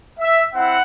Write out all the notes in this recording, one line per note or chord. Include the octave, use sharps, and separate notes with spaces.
E5
C4 E4 F#5